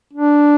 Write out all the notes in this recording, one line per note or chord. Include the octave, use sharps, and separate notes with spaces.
D4